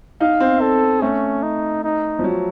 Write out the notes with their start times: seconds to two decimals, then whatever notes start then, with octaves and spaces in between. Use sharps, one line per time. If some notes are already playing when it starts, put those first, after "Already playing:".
0.21 D#4 F5
0.40 C4
0.61 A4
1.02 A3 C#4
1.43 D#4
1.84 D#4
2.19 F3
2.24 F#3